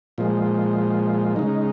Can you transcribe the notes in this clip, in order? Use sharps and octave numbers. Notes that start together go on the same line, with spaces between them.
A#2 F3 G#3
C#3 G#3 D#4